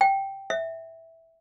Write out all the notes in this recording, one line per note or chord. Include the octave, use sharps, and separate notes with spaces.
G5
E5